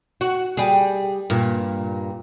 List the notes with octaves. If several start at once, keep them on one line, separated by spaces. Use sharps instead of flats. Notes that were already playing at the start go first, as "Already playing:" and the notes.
F#4
G3 G#4
G2 A#2